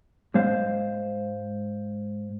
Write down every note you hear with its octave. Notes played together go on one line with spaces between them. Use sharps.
G#2 G#3 C5 F5